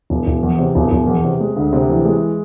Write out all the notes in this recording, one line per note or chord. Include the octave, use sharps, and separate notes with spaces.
E1
E1
E2
C3
E1
E1
E2
C3
G#3
D2
C3
E3
G#3